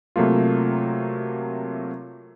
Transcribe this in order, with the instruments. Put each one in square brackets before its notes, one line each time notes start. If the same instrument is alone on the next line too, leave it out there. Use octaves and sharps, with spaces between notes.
[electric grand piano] C3 F#3 A3 A#3 F4